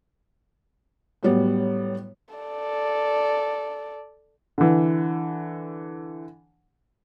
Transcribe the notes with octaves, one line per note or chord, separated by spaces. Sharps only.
A2 F#3 G3 B3
A4 D5
D3 E3